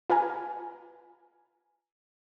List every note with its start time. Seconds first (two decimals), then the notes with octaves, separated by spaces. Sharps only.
0.10 F4 B4 F5 G#5 A#5